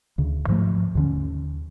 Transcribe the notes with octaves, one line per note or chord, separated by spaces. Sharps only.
D2 C#3
G#2 F3 A3
D#2 D3 C#4